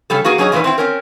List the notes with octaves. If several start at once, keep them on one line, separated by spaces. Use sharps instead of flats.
C#3 G3 A4
A#3 F#4 G#4 B4
F#3 C#4 D4 G#4 C#5 D#5
E2 A#2 D#3 C#4 B4
C4 E4 G5
C4 C#4 A#4